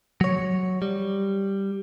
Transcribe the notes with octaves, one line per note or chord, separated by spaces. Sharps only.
F#3 C#5
G3